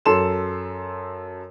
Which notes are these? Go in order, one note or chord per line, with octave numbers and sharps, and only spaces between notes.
F#2 A4 C6 E7